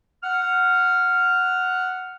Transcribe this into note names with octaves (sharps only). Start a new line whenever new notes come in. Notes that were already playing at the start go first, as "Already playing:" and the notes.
F#5 F6